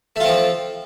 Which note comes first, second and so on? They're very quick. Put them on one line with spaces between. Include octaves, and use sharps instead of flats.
A3 F4 C4 F3